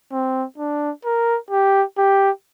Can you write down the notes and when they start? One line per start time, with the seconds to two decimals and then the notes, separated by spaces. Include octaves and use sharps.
0.12 C4
0.58 D4
1.05 A#4
1.51 G4
1.98 G4